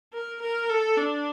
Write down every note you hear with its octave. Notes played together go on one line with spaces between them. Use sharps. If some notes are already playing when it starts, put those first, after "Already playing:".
A#4
A#4
A4
D4